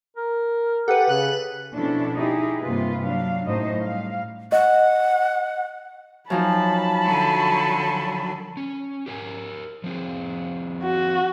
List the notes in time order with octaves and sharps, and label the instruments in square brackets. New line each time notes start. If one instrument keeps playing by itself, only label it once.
[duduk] A#4
[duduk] G4 [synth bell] A4 B4 [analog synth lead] F#5
[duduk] C#3 [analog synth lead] F#6
[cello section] B2 F3 C#4 D4 E4 A4
D#4 E4 G4 G#4
G2 C3 A#3 F4 B4
F#3 D4 F5
F#2 A2 D#4 C5 D#5
G3 F5
[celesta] D#5 [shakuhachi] F#5
[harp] F#2 F3 D#4 [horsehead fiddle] A5 B5
[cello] D3 F#3
[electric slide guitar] C#4
G4 A#4 G#5
F3 C4 G#4
[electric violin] F#4